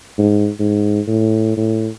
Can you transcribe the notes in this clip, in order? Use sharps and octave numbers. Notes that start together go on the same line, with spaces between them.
G#2
G#2
A2
A2